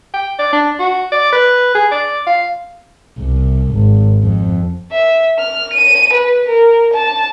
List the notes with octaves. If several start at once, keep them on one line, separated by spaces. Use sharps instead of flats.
G5
D5
D4
F#4
D5
B4
G#4
D5
F5
C2
G#1
F2
E5
F6
D#7
B4
A#4
A5